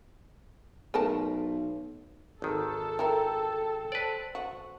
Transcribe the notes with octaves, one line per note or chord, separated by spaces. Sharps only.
B1 A3 A#4 A5
G#1 D#3 A4
E4 A#4 G5
B4 C5 D5
F#4